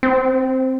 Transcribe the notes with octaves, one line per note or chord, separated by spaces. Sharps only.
C4